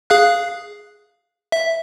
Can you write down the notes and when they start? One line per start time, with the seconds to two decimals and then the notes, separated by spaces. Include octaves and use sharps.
0.10 G#4 F5 F#6
1.52 E5